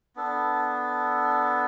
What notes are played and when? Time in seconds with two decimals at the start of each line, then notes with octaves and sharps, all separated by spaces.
0.15 B3 D4 A4